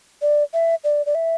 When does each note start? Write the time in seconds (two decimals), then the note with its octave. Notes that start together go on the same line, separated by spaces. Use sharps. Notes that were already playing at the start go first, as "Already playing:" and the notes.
0.22 D5
0.54 E5
0.84 D5
1.06 D5
1.15 E5